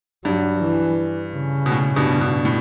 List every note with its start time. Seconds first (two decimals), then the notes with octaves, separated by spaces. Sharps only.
0.24 G2 F#3
0.61 E3
1.35 C#3
1.66 B2
1.72 A2
1.96 G2 B2
2.21 G2 B2
2.45 A2